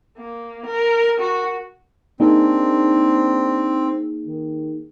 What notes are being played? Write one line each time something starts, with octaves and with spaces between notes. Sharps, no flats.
A#3
A#4
F#4
A#3 C4 D4 D#4 G#4
D#3